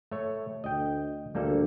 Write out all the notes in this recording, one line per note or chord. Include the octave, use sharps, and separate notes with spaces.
A3 C#5
D2 D#5 G5
D2 G3 A#3 A4